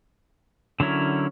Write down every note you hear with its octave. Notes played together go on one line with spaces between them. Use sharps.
D3 F#3 C#4 E4 A#4